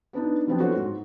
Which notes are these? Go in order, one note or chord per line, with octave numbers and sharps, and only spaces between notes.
B3 D4 D#4
F3 F#3 B3 C4 D4
F4 F#4 A4 C5 C#5 F#5
G#2